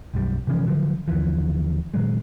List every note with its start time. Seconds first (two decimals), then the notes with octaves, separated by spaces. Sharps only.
0.14 B1 F#2 G3
0.47 C3 E3 F3 C#4
0.67 D3 F3 F#3
1.08 D#2 D3 E3 F3
1.94 A#2 D#3 F#3 G#3